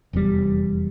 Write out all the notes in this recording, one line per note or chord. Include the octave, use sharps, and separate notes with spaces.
F1 E2 C3 G3